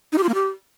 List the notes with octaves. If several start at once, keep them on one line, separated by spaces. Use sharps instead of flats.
D#4
G4
F4
A#3
G4